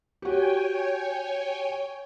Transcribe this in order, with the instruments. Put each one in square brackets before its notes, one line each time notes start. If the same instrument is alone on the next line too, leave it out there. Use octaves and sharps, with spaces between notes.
[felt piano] F#4 G4 [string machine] C#5 G5 G#5